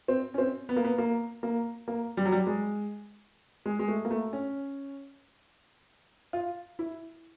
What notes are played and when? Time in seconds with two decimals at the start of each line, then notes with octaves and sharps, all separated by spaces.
0.08 C4
0.34 C#4
0.38 C4
0.69 B3
0.76 A#3
0.85 B3
0.98 A#3
1.43 A#3
1.88 A#3
2.17 G3
2.26 F#3
2.32 G3
2.47 G#3
3.66 G#3
3.79 G#3
3.88 A3
4.05 A#3
4.11 A3
4.33 C#4
6.33 F4
6.79 E4